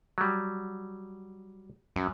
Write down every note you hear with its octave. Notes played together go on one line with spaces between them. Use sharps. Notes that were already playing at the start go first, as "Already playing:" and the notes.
F#3 G3
F#2